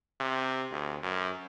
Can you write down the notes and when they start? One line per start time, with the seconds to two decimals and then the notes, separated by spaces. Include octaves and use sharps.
0.21 C3
0.72 D2
1.03 F#2